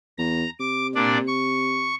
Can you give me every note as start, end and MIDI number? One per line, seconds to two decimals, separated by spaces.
0.18 0.45 40
0.18 0.50 82
0.60 1.97 48
0.60 0.87 86
0.95 1.18 46
0.95 1.18 62
0.95 1.18 74
1.27 1.95 85